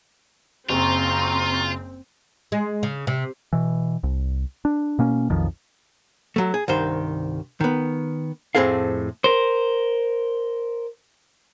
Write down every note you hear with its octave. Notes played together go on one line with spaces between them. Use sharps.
F#1 C4 F4 A#5 C6 C#6
G#3
C#3
C3
B2 E3
C2
D4
B2 A#3 C#4
B1 F2 D#3 F3
F#3 A3
G#4
C2 G2 D#3 C5
D#3 B3
F2 A2 C4 G#4 A4 F5
A#4 C5